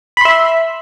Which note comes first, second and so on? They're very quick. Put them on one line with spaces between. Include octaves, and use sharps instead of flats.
B5 C6 E5